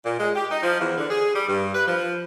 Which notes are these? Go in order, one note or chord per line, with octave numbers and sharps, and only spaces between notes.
A#2
G#3
G4
D#4
F3
E2
D3
G#4
G3
G2
B4
F3